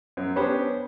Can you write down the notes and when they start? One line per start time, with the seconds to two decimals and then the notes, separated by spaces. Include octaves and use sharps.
0.17 F#2
0.36 B3 C#4 D4 G4 B4 C5